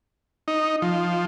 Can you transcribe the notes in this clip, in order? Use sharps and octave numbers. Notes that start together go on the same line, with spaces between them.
D#4
F3